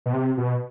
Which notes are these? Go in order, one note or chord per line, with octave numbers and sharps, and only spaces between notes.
B2
C3
B2